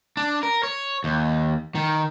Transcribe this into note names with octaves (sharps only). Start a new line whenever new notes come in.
D4
A#4
C#5
D#2
D#3